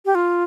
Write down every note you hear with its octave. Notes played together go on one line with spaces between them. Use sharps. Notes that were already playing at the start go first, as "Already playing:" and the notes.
G4
F4